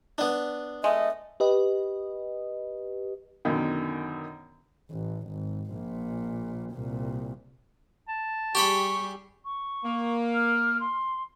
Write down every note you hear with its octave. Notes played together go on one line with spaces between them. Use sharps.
B3 D4
G#3 A3 D#5 E5
G4 B4 D#5
F#2 B2 D3 D#3
A1
G#1
A#1 A#2
C2 A#2
A5
G3 G4 G#4 G5 B5 C#6
C#6
A#3
F6
C6